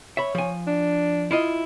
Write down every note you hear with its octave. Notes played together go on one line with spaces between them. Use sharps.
C#5 E5 B5
F3 G#5
D4
E4 F4 D#5